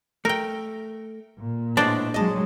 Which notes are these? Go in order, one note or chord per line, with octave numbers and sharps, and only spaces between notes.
A3 A#4 G5
A#2
A2 G#3 B3 D4 C5 D5
F#3 G#3 D#5 A5